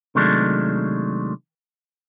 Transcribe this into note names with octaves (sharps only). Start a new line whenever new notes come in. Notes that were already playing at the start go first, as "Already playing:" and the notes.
C3 D#3 F#3 G#3 A3 D4